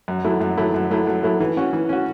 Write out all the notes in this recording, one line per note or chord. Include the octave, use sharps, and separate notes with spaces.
F#2
F#3 A3 E4
F#2
F#3 A3 E4
F#2
F#3 A3 E4
F#2
F#3 A3 E4
E3
C#4 F#4
E3
C#4 F#4